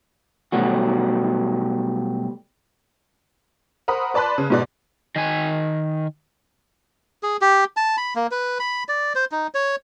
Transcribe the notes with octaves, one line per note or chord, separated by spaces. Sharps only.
B2 F#3 G3 A3 F#4
A#4 C5 F#5 B5 D#6
B4 D5 A5 B5 C6 F#6
C#3
G#2 B2 D5
D#3 G#5
G#4
G4
A5
B5
A#3
B4
B5
D5
C5
D#4
C#5